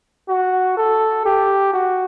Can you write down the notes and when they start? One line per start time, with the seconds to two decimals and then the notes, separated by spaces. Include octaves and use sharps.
0.29 F#4
0.77 A4
1.26 G4
1.73 F#4